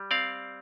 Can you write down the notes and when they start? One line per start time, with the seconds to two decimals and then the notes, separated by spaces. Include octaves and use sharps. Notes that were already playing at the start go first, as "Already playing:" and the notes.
Already playing: G3
0.11 C4 D5 F5